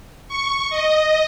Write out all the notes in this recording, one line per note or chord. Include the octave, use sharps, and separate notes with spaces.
C#6
D#5